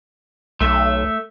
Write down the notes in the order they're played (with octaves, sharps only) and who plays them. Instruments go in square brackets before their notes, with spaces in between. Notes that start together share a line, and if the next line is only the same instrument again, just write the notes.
[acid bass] B1 [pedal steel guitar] A3 E5